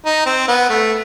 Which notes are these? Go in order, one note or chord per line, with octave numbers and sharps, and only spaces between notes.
D#4
C4
B3
A3